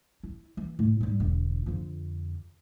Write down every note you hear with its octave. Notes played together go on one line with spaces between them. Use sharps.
E4
E3
A2
G#2 G3
E1 D3
F2 D3